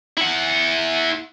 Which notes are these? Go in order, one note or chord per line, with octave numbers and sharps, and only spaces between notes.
E4 F#5